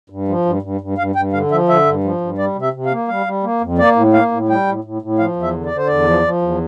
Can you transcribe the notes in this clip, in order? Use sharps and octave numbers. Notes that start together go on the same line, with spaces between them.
G2
F3
G2
G2
G2
G2 F5
G2 G5
D3 F5
F3 E5
D3 E5
G2
F3
G2
G3 D5
C3
E5
C3
F5
A#3
G3 F5
G3
A#3
F2
A#3 D5
A2
A#3 F5
A2
G3 G5
A2
A2
A2
F3 F5
E2
E5
D3
D5
D3
C5
E2 D5
F3
F3
E2